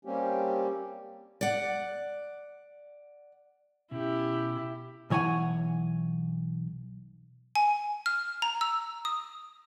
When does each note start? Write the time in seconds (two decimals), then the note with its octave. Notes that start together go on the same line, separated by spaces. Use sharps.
0.05 G3 A#3 C4 C#4 G4
1.41 D5 F#5
3.91 B2 C#4 E4 G4
5.10 B1 E3 C#5 F#5 G#5
7.55 G#5
8.06 F6
8.42 A#5
8.61 E6
9.05 D#6